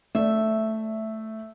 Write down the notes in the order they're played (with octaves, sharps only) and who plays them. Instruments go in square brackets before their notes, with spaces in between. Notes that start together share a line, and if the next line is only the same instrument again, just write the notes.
[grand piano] A3 [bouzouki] E5